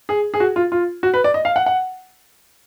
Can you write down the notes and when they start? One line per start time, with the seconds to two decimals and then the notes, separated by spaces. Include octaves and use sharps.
0.09 G#4
0.34 G#4
0.40 F#4
0.56 F4
0.72 F4
1.03 F#4
1.14 B4
1.24 D5
1.34 D#5
1.45 F5
1.56 F#5
1.66 F#5